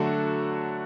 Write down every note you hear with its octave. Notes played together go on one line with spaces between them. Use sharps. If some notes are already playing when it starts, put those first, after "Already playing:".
Already playing: D3 F#3 A3 F#4 A4